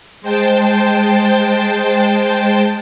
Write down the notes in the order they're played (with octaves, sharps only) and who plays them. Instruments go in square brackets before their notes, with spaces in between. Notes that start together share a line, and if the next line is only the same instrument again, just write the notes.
[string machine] G#3 C5 G5 A5